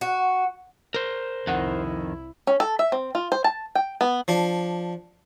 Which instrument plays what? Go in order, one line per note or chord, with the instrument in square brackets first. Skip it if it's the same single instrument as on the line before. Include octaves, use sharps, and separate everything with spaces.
[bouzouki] F#4
[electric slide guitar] A#4 C5
[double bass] C2 E4 [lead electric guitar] F2 D#3 [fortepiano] F#5
[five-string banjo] C#4
A4
E5
C4
F4
C5
A5
G5
B3
[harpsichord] F3 D4